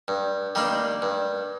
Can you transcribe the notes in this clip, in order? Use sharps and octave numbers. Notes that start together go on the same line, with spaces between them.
G2
D#3 G3 A#3 D4
G2